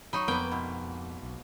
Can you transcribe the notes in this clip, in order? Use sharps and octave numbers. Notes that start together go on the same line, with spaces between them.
F#3 D#4 B5 C#6
F2 A#3 B3 A#4 B4 D5 G5
G#2 B2
B1